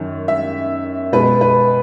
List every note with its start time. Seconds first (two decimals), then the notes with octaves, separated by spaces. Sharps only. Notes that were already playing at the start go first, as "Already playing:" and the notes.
Already playing: F#2 D#3
0.28 E5
1.13 B2 G#3 B4
1.41 B4